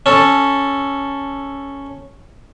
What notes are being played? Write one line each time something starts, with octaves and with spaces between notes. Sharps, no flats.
C#4 A4